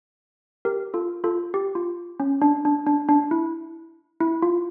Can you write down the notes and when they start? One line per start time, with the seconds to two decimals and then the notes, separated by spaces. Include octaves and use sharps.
0.65 G4 A#4
0.94 F4 A4
1.24 F4 A4
1.54 G4
1.75 F4
2.20 C#4
2.42 D4
2.65 D4
2.87 D4
3.09 D4
3.31 E4
4.20 E4
4.42 F4